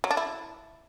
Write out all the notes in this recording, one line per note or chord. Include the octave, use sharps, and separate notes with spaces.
F#3
D4
E4